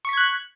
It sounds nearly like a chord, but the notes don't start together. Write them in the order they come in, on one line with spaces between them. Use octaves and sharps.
C#6 B6 G#6 F#6